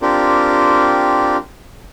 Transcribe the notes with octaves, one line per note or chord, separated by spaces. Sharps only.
C4 D4 F4 G4 A#4